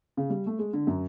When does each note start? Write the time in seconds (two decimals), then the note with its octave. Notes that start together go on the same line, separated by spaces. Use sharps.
0.17 C#3
0.30 G3
0.46 A3
0.59 G#3
0.73 D3
0.87 F#2